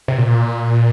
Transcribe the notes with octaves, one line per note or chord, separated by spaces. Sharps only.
C3
A#2